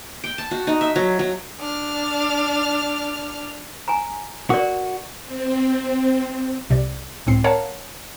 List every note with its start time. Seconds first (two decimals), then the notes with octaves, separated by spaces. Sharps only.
0.24 G5
0.38 A5
0.51 F#4
0.67 D#4
0.81 E5
0.96 F#3
1.19 F#3
1.59 D4 F6
3.88 G#5 A#5
4.50 F#4 A#4 D5
5.23 C4
6.69 C2 C3 D5
7.26 C#2 A2 C4 C7
7.44 A#4 C#5 F5 F#5 A5 A#5